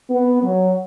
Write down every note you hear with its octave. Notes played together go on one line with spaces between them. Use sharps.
B3
F#3